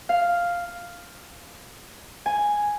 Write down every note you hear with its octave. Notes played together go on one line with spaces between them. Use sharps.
F5
G#5